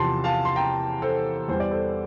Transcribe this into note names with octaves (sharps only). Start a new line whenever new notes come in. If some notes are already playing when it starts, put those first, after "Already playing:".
Already playing: E2 C3 F3 A5 C6
F5 A5
C6
G5 A#5
A4 C5
E2 E3 G3 C5
D5
A4 C5